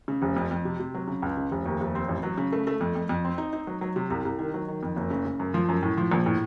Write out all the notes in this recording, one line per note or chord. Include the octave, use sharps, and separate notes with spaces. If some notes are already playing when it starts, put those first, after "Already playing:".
C#3
F1
F2
F2
C3
C3
F#3
C#3
C#2
C#3
F1
D#2
F1
C4
A1
F#3
C#3
A3
A3
F2
F2
F2
C4
D#4
D#4
F#3
F#3
C3
C2
C2
D#3
F#3
D#3
F2
F#1
C#3
C#3
F#2
F3
F#2
A2
F3
A#1
A2